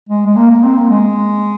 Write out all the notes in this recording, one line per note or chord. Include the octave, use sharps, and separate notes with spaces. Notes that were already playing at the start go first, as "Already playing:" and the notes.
G#3
G#3
A#3
A#3
C4
A#3
G#3